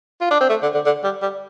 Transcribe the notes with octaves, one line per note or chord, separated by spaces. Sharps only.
F4
D4
C4
A3
D3
D3
D3
G3
G3